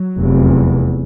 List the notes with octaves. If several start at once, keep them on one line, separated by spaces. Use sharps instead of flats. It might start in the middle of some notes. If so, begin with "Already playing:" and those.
Already playing: F#3
F1 E2 C3